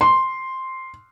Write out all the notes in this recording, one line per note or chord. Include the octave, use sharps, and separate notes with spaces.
C6